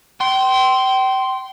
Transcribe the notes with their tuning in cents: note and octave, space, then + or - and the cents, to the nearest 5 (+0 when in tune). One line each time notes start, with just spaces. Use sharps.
G5 -30 C6 +0